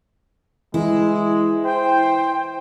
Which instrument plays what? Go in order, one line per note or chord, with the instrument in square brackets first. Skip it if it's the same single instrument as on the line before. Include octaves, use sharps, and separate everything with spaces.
[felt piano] E3 [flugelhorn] G#3 [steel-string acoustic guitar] E4
[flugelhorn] C5 [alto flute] G5